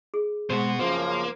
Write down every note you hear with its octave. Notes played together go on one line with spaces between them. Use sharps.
G#4
B2 G#3 F#4 C5
F#2 C#3 F3 A#3 C5